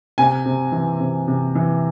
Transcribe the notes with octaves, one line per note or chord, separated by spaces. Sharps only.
C3 G#5
C3
E3
C3
C3
E3